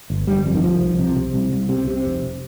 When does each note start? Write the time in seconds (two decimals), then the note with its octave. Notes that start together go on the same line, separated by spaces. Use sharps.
0.10 G1
0.27 G1 G3
0.46 F2
0.55 D#3
0.64 C2 F3
0.82 C2
0.99 C3
1.16 C3
1.34 C2
1.53 C2
1.69 C3
1.87 C3
2.05 F1